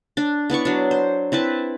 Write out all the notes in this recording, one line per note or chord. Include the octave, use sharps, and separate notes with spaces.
D4
B3 E4 D5 C#6
F#3 D4
C5
C4 E4 B4 A5